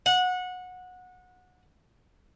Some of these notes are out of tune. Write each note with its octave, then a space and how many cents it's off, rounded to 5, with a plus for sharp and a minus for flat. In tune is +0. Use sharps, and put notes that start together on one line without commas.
F#5 -20